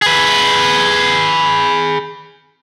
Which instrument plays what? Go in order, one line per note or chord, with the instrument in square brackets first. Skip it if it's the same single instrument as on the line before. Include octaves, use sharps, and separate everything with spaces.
[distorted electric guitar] G#4 B4